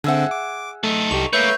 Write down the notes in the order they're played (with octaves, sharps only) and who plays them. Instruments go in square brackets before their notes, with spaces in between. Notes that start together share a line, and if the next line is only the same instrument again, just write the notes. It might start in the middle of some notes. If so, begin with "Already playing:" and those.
[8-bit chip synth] D3 C4 [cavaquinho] G#4 E5 F#5
[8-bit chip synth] D6
[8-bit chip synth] A3 [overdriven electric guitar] D#4 A4
[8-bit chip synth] C2 G4 [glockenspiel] C#6 F7
[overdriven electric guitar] A3 A#3 [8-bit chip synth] B4 C#5 E5 [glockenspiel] G6 F7